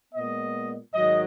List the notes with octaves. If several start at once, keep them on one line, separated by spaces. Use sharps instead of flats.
A#2 G#3 B3 D#5
G#2 D#3 F#3 D#5